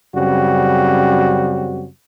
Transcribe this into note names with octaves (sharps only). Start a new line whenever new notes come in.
F#2 C#3 G3 C4 F#4